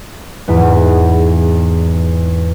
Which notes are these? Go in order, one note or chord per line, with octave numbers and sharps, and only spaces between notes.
E2 G#2 B3